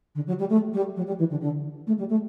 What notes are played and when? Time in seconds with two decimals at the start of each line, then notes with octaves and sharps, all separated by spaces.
0.15 D3
0.27 F#3
0.39 G3
0.49 A3
0.73 G3
0.96 F#3
1.07 G3
1.18 E3
1.30 D3
1.41 D3
1.87 A3
1.98 G3
2.09 A3